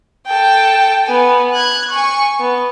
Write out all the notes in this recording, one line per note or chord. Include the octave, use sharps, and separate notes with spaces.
A4 G5
B3 G#5
F#6 G#6
G#5 C#6
B3